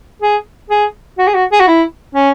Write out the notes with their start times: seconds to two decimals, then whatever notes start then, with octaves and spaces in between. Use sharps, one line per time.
0.22 G#4
0.70 G#4
1.18 F#4
1.27 G#4
1.34 F#4
1.52 G#4
1.60 F#4
1.67 E4
2.15 C#4